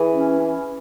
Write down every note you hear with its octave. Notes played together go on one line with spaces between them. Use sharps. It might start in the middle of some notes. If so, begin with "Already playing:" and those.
Already playing: E3 G#4
C#4
C#4